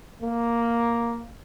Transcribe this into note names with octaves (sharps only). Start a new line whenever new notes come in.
A#3